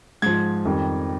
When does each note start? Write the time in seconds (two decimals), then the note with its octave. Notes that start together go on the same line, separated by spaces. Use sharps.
0.22 G#2 F3 G#6
0.65 F2 D#3 G3